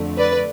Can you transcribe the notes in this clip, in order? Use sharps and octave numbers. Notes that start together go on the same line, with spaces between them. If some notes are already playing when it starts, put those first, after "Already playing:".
Already playing: F2 D3 A3
B4 D5